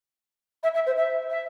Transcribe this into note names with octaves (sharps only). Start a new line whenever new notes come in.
E5
E5
C5
E5
E5